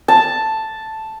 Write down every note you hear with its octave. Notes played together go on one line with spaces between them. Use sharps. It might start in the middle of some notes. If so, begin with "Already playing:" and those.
A5